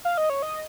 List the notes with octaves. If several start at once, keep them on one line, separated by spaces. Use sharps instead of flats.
F5
D#5
C#5
D#5